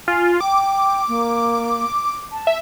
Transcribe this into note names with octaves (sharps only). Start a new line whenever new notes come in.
F4 G#5
G5 D6
A#3
A5
E5